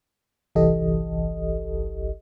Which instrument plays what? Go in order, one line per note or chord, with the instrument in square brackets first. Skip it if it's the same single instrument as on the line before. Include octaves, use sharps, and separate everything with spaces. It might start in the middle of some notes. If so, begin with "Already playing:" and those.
[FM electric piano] G1 C2 E3 G4 A4 D#5